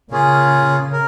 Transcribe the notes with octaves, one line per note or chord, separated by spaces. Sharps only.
C#3 A#3 C#4 F4 G#4
A#4